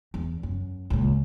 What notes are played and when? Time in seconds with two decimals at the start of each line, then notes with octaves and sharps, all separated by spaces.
0.14 E2
0.43 F#2
0.90 C#2 A#2